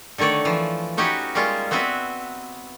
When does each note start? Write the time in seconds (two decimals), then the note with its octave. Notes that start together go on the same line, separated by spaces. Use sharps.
0.18 D3 D#3 A3 C#5 D5
0.45 E3 F3
0.97 C#4 D#4 F#4 G4 B4 C#5
1.35 G3 G#3 A#3 C#4 F4
1.71 B3 C4 F#4 B4 E5